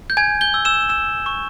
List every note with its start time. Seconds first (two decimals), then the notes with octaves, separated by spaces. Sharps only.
0.10 G6
0.17 G#5 G#6
0.41 G6 G7
0.54 E6
0.65 E6 E7
0.90 E6 E7
1.26 C#6